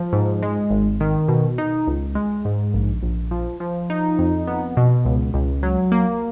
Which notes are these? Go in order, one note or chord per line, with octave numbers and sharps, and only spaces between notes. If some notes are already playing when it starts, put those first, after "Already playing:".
Already playing: F3
G#2
G#3
G#1
D#3
B2
D#4
C#2
G#3
G#2
A#1
A#1
F3
F3
D#4
F2
B3
B2
C#2
C#2
F#3
A#3